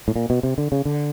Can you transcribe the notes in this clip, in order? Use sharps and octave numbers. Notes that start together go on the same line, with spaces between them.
A2
A#2
B2
C3
D3
C#3
D3